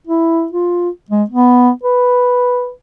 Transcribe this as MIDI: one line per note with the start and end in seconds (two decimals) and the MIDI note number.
0.07 0.47 64
0.53 0.89 65
1.10 1.23 56
1.30 1.70 59
1.83 2.71 71